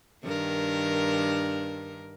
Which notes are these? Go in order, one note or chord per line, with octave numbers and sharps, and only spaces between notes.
G2 D#3 A#4